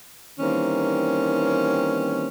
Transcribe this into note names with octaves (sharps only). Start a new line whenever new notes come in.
D#3 E3 G3 A#3 C4 C#4